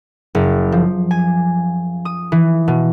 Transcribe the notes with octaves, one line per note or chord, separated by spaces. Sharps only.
F#1
F3
G#5
D#6
E3
B2